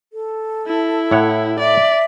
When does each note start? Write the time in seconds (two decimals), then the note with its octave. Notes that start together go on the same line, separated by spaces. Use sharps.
0.13 A4
0.67 E4
1.11 A2 C#5 F#5
1.59 D5 E5